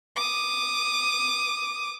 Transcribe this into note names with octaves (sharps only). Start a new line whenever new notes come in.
D6 D#6